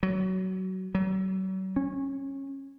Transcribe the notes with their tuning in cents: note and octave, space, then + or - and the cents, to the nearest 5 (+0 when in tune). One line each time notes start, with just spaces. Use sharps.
F#3 +20
F#3 +40
C#4 -20